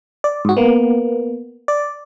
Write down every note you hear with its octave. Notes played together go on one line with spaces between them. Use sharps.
D5
G#2 F#4
A#3 B3
D5